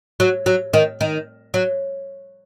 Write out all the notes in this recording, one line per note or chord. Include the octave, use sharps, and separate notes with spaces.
F#3
F#3
D#3
D#3
F#3